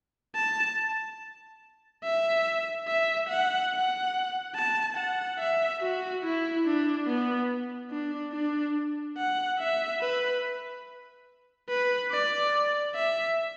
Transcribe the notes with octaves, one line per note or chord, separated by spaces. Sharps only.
A5
E5
E5
F#5
F#5
A5
F#5
E5
F#4
E4
D4
B3
D4
D4
F#5
E5
B4
B4
D5
E5